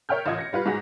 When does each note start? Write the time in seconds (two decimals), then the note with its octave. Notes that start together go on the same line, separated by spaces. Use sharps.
0.09 A#4 C#5 E5 G5 F6 G6
0.26 A1 F4 D#5 G#6
0.38 A#6 C#7
0.53 G3 F4 B4
0.65 G#2 G#3 F#4 G#4 A#6